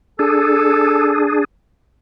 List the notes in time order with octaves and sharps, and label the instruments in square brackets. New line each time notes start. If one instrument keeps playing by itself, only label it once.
[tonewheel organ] D4 G#4 [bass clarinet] A4